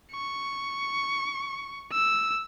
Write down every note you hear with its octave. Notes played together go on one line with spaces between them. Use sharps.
C#6
E6